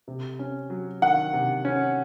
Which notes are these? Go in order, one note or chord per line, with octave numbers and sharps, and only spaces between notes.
C3
C#4
F#3
D#3 F#5
C3
C#4